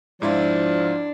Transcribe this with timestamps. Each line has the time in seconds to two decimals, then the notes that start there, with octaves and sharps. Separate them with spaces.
0.22 G#2 F3 D4 E4 F4